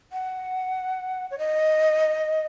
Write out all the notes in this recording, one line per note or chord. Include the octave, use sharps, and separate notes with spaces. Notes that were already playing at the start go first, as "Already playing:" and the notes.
F#5
C#5
D#5